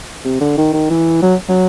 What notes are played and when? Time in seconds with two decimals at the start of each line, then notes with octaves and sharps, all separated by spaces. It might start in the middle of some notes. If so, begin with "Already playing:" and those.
0.25 C3
0.41 D3
0.57 D#3
0.73 D#3
0.90 E3
1.22 F#3
1.49 F#3